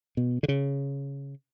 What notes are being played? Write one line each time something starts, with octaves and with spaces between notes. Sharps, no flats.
B2
D3
C#3